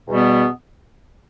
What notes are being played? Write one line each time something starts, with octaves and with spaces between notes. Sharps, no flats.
E2 B2 G3 B3